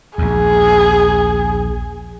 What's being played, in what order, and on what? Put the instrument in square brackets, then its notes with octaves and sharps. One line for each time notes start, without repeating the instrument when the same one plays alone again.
[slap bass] A#1 D#2 [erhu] G#4